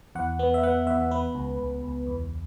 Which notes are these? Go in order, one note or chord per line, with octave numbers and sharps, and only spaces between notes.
E2 F#5
B3
E5
B3 F#5
E2 E5
B3 B4
C#2
C#2
C#2
E2